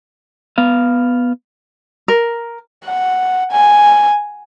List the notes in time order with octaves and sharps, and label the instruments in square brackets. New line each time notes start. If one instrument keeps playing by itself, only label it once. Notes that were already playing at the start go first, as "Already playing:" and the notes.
[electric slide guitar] B3 F5
[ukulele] A#4
[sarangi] F#5
G#5